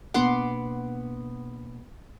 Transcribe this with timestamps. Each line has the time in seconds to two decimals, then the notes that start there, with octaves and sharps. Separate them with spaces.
0.14 B2 A#3 B3 D4 F#5 C6 D6